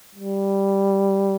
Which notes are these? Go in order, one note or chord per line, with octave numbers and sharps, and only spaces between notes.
G3